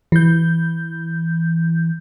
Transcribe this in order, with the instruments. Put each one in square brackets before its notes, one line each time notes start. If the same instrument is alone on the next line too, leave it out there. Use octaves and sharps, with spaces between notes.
[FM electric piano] E3 G6